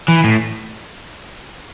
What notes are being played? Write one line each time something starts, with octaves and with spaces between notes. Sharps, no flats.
E3
A2